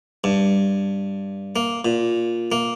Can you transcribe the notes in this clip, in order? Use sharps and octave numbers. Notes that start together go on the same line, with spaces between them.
G2
A#3
A#2
A#3